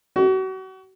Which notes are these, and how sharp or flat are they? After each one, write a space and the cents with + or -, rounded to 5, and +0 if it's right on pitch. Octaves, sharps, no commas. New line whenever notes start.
F#4 +35